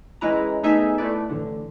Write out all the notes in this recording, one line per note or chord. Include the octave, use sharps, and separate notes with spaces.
E3 G#3 C#4 E4 B4 A#5
A3 B3 D#4 G#4 E5 G#5
A3 E4 B4 D5
A1 D3